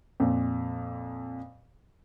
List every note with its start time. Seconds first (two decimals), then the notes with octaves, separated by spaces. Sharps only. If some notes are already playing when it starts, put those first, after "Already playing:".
0.20 F2 A#2